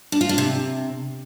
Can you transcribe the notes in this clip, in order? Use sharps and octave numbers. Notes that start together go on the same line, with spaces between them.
D4
F4
D4
C3